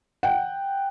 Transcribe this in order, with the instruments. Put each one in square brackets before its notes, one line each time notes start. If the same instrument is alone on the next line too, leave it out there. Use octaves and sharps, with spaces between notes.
[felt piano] F#5 G5